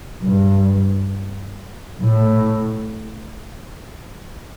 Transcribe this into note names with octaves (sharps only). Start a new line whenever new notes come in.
G2
A2